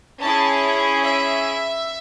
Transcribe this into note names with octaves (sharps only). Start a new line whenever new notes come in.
C#4 E4 G#4 A5
E5